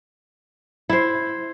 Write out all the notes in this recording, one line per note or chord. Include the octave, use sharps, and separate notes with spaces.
E4 C5